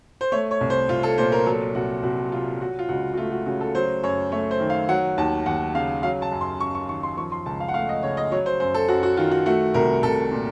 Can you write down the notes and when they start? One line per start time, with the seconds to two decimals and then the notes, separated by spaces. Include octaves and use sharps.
0.21 C5
0.32 A3 C#5
0.51 C#5
0.61 C2
0.70 C5
0.89 C2 F4
1.03 A4
1.18 A#2 C5
1.32 A#4
1.46 F#3 A4
1.75 C2 F#4
2.03 C2 F#4
2.32 C3 F4
2.61 F#3 F#4
2.79 F4
2.89 C#2 F#4
3.13 F#4
3.17 A3 F4
3.32 F#4
3.46 C#3 F#4
3.61 A4
3.75 F#3 C5
4.03 F#2 C#5
4.32 A3 C#5
4.51 C5
4.60 D#3
4.70 F5
4.89 F#3 F#5
5.17 D#2 A5
5.46 D#2 F#5
5.74 C#3 F5
6.03 F#3 F5
6.22 A5
6.32 F#2
6.41 C6
6.60 F#2 C#6
6.75 C#6
6.89 D#3 C#6
7.03 C6
7.17 F3 C#6
7.32 C6
7.46 C#2 A5
7.60 F5
7.68 F#5
7.74 A3 F5
7.89 D#5
8.03 C#3 C#5
8.17 D#5
8.32 F#3 C#5
8.46 C5
8.60 F#2 C5
8.74 A4
8.88 F#2 F#4
9.03 F#4
9.17 D#3 F4
9.31 F#4
9.46 A3 F#4
9.74 C2 A#4
10.03 C2 A4
10.31 A#2